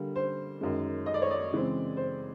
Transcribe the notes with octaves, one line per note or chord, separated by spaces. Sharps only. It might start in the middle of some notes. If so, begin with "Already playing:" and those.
Already playing: D3 G3 A#3
C5
F#2 D#3 G#3
D#5
D5
C#5
D5
C#3 E3 G#3 C4
C5